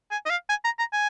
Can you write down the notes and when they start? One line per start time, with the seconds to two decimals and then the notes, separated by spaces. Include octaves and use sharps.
0.11 G#5
0.26 D#5
0.30 F5
0.49 G#5
0.65 A#5
0.79 A#5
0.93 G#5